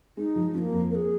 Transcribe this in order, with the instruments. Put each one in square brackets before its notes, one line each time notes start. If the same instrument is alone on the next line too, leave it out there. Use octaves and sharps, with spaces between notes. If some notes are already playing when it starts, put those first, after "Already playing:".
[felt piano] G#3 [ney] D#4
[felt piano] F3
[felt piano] F3 [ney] A#3 C#4
[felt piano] F2
[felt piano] A#3 [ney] G#4 A#4